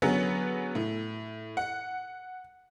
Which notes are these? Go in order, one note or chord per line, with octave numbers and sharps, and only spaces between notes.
D3 F#3 B3 C#4 F#4 G#4
A2
F#5